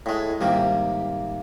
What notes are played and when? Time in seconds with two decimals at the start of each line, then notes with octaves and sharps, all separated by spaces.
0.06 A2 G#3
0.41 G#2 C3 D#3 G3 A#3